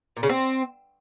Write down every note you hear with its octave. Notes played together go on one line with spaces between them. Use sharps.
A#2
C#3
C4